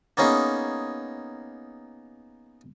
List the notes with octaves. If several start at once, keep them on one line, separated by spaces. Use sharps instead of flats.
A#3 B3 C#4 D#4 G#4